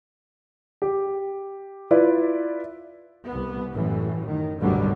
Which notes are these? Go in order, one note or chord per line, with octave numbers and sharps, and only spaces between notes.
G4
E4 F4 B4 D5
C2 B3
A1 F#2 A2 E3
D#3
G#1 D2 B2 D3 F#3 G3